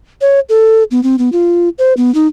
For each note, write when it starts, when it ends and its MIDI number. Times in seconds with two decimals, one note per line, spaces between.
0.21 0.40 73
0.49 0.83 69
0.91 1.03 59
1.03 1.16 60
1.18 1.29 59
1.32 1.69 65
1.78 1.93 72
1.97 2.13 59
2.14 2.27 63